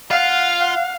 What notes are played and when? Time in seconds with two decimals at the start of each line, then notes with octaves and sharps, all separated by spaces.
0.11 F4 F5 F#5
0.60 F#5